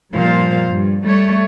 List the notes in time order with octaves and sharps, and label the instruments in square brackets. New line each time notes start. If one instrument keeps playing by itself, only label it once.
[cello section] G2 A#2 F3 C5 F5
G2
G3 A3 C#5